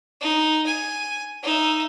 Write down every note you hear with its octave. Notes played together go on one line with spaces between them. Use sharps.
D#4
G#5
D#4 E5